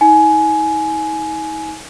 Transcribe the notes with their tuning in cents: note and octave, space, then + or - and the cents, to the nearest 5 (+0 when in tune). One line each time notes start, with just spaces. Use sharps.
D#4 +40 G#5 +20